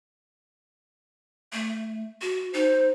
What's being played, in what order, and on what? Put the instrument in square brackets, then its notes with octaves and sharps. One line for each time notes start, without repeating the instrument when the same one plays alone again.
[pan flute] A3
F#4
[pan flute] D#4 [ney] C5